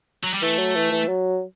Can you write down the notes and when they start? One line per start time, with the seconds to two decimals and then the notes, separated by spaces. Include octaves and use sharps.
0.23 F#3
0.34 G3
0.42 E3 A3
0.59 F#3
0.76 E3
0.92 E3
1.09 F#3